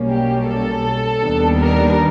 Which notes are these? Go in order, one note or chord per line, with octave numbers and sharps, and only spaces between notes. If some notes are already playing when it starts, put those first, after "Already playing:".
Already playing: B1 B2 G3 A#3 C#4
G4
A4
D#2 D#3 G3 B3 D4
A#4